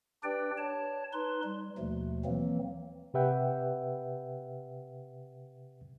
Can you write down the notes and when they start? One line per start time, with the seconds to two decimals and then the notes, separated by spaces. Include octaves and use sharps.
0.24 D4 G4 B4 D5 G5
0.58 C#5 A5
1.13 D#4 B4 C6
1.44 G3
1.78 D#2 B2 F3 A3
2.25 E3 F#3 A#3 C4
3.14 C3 G4 B4 E5 F#5 G5